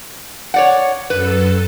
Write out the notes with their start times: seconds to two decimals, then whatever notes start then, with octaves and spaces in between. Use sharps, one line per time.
0.54 C#5 D5 F#5
1.10 F#2 A4 B4